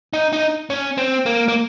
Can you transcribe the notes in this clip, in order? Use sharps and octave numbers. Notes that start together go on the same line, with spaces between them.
D#4
D#4
C#4
C4
A#3
A#3